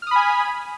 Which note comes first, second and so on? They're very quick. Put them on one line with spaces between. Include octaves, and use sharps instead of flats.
F6 D#6 B5 G#5